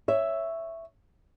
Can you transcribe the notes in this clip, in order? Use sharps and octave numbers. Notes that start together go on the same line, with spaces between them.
C#5 E5